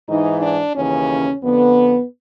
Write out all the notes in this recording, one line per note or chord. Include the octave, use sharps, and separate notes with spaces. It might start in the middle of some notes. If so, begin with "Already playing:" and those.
G#2 E3 D#4
D4
D#2 C#3 E3 C#4
F2 D3 B3